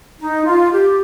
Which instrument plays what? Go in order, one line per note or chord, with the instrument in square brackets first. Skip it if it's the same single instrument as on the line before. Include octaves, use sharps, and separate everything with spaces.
[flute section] D#4
F4
G4